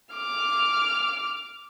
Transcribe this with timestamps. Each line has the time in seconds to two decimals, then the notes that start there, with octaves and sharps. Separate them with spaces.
0.14 D6 F6